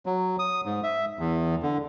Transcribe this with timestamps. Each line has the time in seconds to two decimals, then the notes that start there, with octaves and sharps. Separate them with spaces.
0.06 F#3
0.39 D#6
0.66 G#2
0.83 E5
1.19 E2
1.62 D3